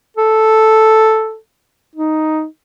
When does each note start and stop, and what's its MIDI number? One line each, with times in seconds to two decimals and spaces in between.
0.17 1.37 69
1.96 2.45 63